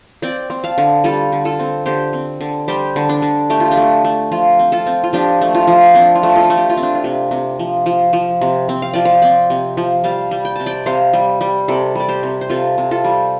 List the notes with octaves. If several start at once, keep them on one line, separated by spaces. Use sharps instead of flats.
C4 D5 G5
C4
F5 A5
D3
G3 F4 A4
D3
F4 A4
C4
D3 G4 C5
C4
D3
G3 G4 C5
D3
D4
D3
A3 G4
F4
D4 G4
A3
A3
F3 F4
C4
F4 A4
C4
F4
F3 D4 G4
A3
F4
F3
C4 D4
F4
A3
F4 A4
A3
G4
F4
C4
D4
F4
C3
C3
F3
F3
F3
C3
C4
F5
F3 D5
C5 F5
C4 D5 G5
C3
F3
G3 F5 A5
G3
G5
C3 A5
D5 G5
C3 C5 F5
G3
G3
C3 A4 D5
G3 D5
G4 C5
C3
C5
C3 F4 A4
C3
F4 A4
G3